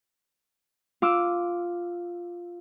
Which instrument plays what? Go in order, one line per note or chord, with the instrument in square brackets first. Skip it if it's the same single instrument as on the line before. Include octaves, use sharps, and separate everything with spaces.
[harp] F4 D6 E6